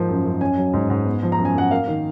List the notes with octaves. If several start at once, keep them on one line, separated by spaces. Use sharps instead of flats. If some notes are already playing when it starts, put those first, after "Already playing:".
Already playing: G#2 F3 A#3
F#2
F#2
C#4 G#5
F#3
G#2
G#2
B3
F3
A#5
F#2
G#5
F#2 F#5
A#3 F5
D#3